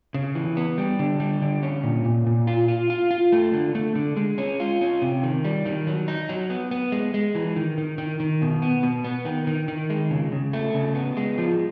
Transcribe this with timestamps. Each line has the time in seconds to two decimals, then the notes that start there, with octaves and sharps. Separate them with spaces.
0.14 C#3
0.35 E3
0.57 B3
0.78 G3
0.99 D3
1.20 G3
1.42 D3
1.63 C#4
1.83 A#2
2.05 A#2
2.26 A#2
2.47 F4
2.68 F4
2.90 F4
3.11 F4
3.32 A3
3.53 D3
3.75 A3
3.95 D3
4.17 G#3
4.38 C#4
4.60 F4
4.81 C#4
5.02 C3
5.23 D#3
5.45 G3
5.66 D#3
5.87 F#3
6.08 D#4
6.29 F#3
6.50 B3
6.71 B3
6.92 G#3
7.14 G#3
7.35 E3
7.56 D#3
7.78 D#3
7.98 D#3
8.20 D#3
8.42 B2
8.62 B3
8.83 B2
9.04 B3
9.25 D#3
9.47 D#3
9.68 D#3
9.90 G#3
10.11 C#3
10.32 C#3
10.53 A3
10.74 C#3
10.95 B3
11.17 G#3
11.38 F3